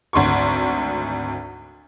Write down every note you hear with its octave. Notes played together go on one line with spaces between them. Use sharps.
G#1 D2 C6 C#6